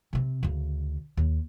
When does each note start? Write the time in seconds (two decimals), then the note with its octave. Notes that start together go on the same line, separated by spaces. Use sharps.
0.13 C3 C4
0.43 D2 C#3
1.17 D#2